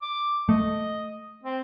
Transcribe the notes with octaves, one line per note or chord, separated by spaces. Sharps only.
D6
A3 D#5
C4